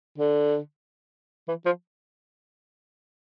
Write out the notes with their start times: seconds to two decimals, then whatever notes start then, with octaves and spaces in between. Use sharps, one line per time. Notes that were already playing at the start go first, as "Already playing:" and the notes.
0.18 D3
1.48 E3
1.66 F3